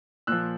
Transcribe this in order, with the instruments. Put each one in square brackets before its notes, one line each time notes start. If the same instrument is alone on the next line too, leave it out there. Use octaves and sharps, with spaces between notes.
[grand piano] A#2 F3 E6 F#6